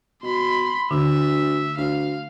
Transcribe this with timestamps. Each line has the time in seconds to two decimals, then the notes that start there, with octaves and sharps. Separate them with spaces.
0.23 B2 B5 C6
0.91 D2 D3 E5
1.77 D2 F5